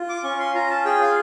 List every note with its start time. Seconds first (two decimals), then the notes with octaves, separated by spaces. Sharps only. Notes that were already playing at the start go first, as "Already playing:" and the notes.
Already playing: F4
0.09 D6
0.24 C#4 C#6
0.39 C6
0.54 F4 A#5
0.70 A5
0.85 G#4 G5
1.01 F5